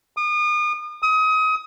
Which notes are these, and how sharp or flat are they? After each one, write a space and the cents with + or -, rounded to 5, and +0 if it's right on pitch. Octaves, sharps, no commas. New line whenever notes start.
D#6 -40
D#6 +30